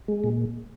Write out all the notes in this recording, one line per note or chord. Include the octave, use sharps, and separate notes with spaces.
G#3
A#2